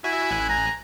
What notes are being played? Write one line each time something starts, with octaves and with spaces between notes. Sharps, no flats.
E4 F#4 E5 G#5
A1 G#5 F#6
A#5